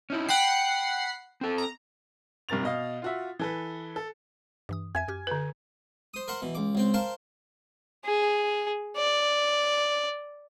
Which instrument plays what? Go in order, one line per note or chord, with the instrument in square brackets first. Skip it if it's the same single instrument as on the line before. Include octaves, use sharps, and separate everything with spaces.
[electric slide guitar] C#4 D#4 E4
[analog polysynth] F#5 B5 C7 [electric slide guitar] G5
[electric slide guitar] C4 A4
[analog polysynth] A#5
[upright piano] G2 C3 A#4 A6 F7
B2 D#5 F5
F4 F#4 E5
E3 A4 B4
A4
[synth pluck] G2 E3 D#6
[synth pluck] F2 E5 G#6 [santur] G#5
[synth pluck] F#2 G4 F6
[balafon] D3 B4
[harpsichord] C5 D#6
A#4 C5 F#5
B2 E3
C#2 D6
C#2 C4 G5
A#4 C5 F5 G5 A5
[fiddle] G#4
D5